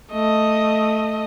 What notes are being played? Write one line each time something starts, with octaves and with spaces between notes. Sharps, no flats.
A3 D#5